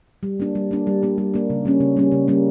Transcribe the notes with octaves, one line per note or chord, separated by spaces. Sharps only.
G3
A#3 D4
G3
A#3 D4
G3
A#3 D4
G3
A#3 D4
C#3
G3 A#3 C#4
C#3
G3 A#3 C#4
C#3
G3 A#3 C#4